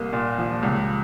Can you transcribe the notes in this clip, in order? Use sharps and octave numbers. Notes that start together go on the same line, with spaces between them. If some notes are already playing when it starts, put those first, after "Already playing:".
Already playing: C2 A#3
A#2
F3
C#2